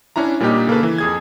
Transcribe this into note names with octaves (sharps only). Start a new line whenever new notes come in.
C#4 D4 E4 A#5
A#2 G3 A#3 D4 D#4 G4
C#3 A#3 A4 B4
E3
F2 G#4 G#6